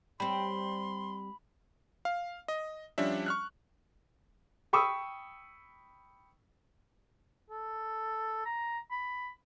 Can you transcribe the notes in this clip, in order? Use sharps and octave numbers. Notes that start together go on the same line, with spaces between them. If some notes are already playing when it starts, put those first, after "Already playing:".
G3 C4 B5 C6
F5
D#5
F3 G3 C#4 D4 E5
C#6 F6 F#6
G5 B5 C#6 D#6 E6
A4
A#5
B5